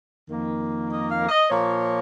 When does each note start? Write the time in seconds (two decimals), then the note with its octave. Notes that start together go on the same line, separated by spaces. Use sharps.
0.30 F2 D#3 A#3
0.90 D#5
1.10 F5
1.29 D#5
1.49 A#2 F3 A#3 C#5